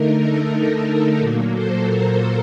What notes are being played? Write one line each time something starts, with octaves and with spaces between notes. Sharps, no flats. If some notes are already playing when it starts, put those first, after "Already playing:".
Already playing: D3 A3 D#4 A#4
A4
A#4
A#4
A#2 F#3 A#3
A4 C5
A#4